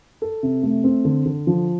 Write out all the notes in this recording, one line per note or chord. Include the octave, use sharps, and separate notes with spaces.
A4
C3
A3
C4
D3
D3
F3